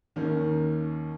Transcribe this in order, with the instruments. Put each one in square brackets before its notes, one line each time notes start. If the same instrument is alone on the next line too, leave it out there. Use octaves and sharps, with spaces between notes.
[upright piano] D#2 D#3 A#3 C#4